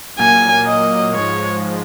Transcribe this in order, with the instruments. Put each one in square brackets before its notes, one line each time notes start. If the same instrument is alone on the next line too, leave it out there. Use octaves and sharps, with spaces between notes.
[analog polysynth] A#2 F#3 A#3 [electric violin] G#5
[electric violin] D#5
[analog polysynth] G#2 F3 G#3 [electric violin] C#5